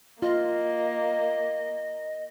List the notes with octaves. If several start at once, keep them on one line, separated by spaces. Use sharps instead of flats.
A#3 F4 D#5